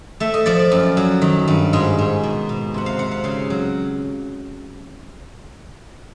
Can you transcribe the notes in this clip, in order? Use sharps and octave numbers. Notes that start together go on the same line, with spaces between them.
A3 E5
D#5
F3 D5
D5
F#2
F#3
D#3
G2
G#2 D#5
G#2
B2
B2
C3 F#5
F5
C3 F#5
F5
C#3 F5
F#3